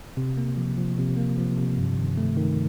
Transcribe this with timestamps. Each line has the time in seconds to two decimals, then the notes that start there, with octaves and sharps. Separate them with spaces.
0.17 C3
0.37 A#3
0.57 F3
0.77 F3
0.98 C3
1.17 A#3
1.37 F3
1.57 C3
1.78 G2
1.97 D#3
2.18 A3
2.37 D#3